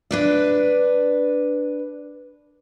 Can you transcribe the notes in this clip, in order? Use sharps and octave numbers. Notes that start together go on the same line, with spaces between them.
D4 B4 D5